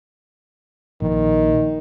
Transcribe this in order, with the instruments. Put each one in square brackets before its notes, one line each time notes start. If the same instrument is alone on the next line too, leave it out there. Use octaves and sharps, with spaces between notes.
[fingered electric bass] A#1 [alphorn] D#3